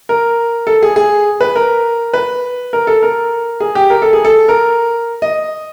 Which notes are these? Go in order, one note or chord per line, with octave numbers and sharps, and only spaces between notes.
A#4
A4
G#4
G#4
B4
A#4
B4
A#4
A4
A#4
G#4
G4
A#4
A4
G#4
A4
A#4
D#5